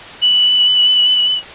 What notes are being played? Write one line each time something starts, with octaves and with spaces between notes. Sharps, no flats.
F#7